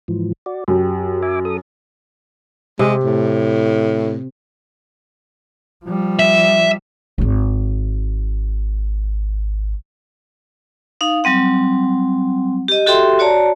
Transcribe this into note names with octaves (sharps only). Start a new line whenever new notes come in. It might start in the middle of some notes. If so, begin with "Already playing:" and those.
G#2 E3 F3
F#4 D5
F#2 G4
E5 G#5 D6
A4 D#6
C3 G#3
A2
F3 G3
E5
D#1 G#1
D#4 F5
F#3 G3 C4 F#5
G4 D#5
F#4 G4 A4 E5 G5 C6
F#4 C#5 D5 A5 A#5